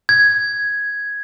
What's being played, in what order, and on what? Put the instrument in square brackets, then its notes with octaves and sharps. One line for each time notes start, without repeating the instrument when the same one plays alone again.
[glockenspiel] G#6